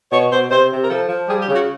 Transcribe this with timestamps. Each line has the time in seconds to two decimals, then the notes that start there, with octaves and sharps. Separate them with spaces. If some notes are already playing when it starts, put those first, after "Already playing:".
0.12 B2 C#5
0.32 B2 C5
0.51 C3 C5
0.71 C3
0.83 A#4
0.89 F3 A4
1.09 F3
1.28 G3 G#4
1.41 G4
1.48 C#3
1.54 F#4